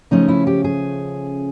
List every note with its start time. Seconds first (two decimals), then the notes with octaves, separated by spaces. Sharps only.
0.11 C#3 F3 A3 C#4 D#4
0.28 E4
0.47 G4
0.64 G#4